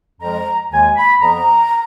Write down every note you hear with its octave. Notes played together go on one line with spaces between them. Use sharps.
F2 F3 G#3 A#5
D#2 D#3 G#3 G#5
B5
F2 F3 B3 A#5